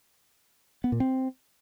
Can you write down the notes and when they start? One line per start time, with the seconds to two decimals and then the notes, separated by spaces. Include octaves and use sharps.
0.84 B3
0.92 A#2
1.00 C4